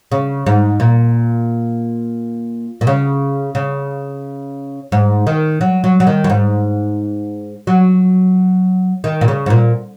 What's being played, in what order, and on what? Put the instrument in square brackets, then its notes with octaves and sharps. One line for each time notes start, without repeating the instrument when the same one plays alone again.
[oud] C#3
G#2
A#2
A#2
C#3
C#3
G#2
D#3
F#3
F#3
F#3
D#3
F#2
G#2
F#3
D#3
A#2
C#3
G#2
A#2